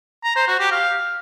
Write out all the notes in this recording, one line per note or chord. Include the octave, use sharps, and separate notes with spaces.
A#5
C5
F#4
G4
F5